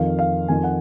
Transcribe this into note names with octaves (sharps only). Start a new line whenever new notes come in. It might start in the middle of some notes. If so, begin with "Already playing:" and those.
Already playing: F2 D#3 F5
F5
F2 D#3 G#5
F#5